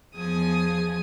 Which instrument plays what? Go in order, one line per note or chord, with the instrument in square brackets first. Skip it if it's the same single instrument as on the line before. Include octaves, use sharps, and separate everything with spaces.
[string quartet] E2 F3 B3 G#4 G#5 D#6